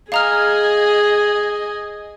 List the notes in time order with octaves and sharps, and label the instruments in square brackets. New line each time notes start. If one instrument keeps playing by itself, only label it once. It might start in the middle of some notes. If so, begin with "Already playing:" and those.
[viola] G#4 [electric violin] D#5 G#5 [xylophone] F5 A#5 F6